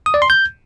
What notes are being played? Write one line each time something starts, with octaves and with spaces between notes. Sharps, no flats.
D#6
D5
C6
G6